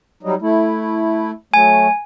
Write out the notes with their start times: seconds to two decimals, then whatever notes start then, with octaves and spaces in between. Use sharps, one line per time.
0.23 F#3 G3 D#4
0.42 A3 E4
1.54 F#3 A3 G#5